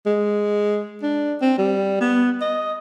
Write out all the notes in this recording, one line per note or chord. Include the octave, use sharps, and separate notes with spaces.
G#3
D4
C4
G3
B3
D#5